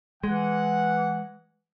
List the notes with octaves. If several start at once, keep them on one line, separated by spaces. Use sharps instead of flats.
E3 G#3 F#5